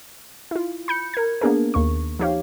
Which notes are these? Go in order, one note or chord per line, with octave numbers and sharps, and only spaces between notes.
E4 F4
B5 G6 C#7
A#4 G#6
A#3 B3 D4 G#4 A#4
D#2 A#3 C#6
F3 D#4 G4 C#5 F5